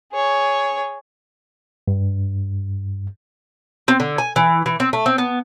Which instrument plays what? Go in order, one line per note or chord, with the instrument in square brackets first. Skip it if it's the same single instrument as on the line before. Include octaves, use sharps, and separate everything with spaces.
[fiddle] G#4 C#5
[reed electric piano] G2
[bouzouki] C4
D3
G#5
E3
E3
C4
A3
C4
B3